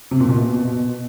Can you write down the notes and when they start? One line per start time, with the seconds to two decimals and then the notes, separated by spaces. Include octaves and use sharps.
0.11 C3
0.20 A#2
0.29 B2